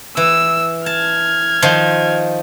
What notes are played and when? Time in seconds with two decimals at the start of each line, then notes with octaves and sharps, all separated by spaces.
0.17 E3 E6
0.86 A5 F6 G#6
1.62 D#3 F3 C6